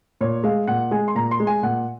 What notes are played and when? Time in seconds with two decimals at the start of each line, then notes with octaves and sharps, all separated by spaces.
0.21 A#2 C#5
0.44 G#3 F5
0.67 A#2 F#5
0.91 G#3 G#5
1.08 C6
1.15 A#2 A#5
1.31 C6
1.40 G#3
1.47 G#5
1.63 A#2 F#5